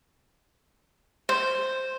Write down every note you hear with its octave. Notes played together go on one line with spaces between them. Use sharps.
C5